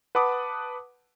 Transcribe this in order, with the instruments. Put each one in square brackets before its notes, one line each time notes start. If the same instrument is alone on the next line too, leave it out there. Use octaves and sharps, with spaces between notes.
[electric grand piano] B4 F#5 A5 B5 D6 D#6